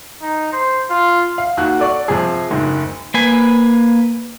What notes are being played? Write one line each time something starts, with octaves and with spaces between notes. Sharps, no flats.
D#4
C5
F4
F5
D#2 F#4 F#6
A4 D5 C#6
C3 F3 G#4
F#1 D2 G#2
A#3 B4 G#5